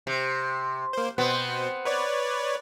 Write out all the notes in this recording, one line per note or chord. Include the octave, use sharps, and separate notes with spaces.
C3
A#3 C5
B2 B3 C4 C5
B4 C#5 D5